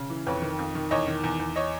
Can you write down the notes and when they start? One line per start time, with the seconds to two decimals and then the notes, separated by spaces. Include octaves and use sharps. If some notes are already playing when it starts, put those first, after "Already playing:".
Already playing: C#3
0.10 E3
0.26 F2 B4 C#5
0.42 D#3
0.59 F2
0.75 D#3
0.91 E2 C#5 D#5
1.07 D#3
1.24 E2
1.40 E2
1.56 C#5 D#5